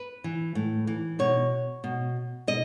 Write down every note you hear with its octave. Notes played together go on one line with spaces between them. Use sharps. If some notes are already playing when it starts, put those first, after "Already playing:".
Already playing: B4
E3
A2
E3
B2 C#5
B2
B2 D#5